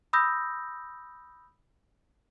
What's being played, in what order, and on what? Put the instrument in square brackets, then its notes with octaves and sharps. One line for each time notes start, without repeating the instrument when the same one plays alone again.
[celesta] B5 D#6 E6 G6 A#6